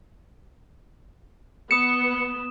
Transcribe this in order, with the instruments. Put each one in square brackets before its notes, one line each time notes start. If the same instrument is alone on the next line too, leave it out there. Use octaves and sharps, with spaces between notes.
[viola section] B3 [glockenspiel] D#6 E7 [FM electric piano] C#7